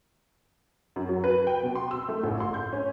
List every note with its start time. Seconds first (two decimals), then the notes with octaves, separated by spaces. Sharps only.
0.96 F#2
1.09 F#3
1.24 B4
1.47 G5
1.63 B2
1.75 C6
1.91 E6
2.09 A3
2.23 A1
2.40 C6
2.54 G6
2.73 C#4